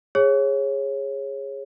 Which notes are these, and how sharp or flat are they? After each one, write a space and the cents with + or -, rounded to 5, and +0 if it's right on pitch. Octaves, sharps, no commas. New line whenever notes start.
G#4 -15 C#5 -20